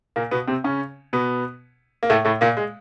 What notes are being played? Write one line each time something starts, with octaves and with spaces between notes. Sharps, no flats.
A#2 A#3
B2 B3
C3 C4
C#3 C#4
B2 B3
A#3
A2 A3
A2 A3
A#2 A#3
G#3